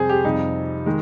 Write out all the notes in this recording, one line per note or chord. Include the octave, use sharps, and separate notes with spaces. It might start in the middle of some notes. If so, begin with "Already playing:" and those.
Already playing: F2 C3 G3 G#4 C5
G4
F2 C3 G3 D#4
D#3 G#3